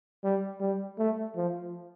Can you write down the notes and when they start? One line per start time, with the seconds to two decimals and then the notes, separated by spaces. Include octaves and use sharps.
0.24 G3
0.60 G3
0.99 A3
1.36 F3